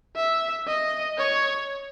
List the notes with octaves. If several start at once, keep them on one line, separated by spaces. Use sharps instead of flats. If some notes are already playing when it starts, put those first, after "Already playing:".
E5
D#5
C#5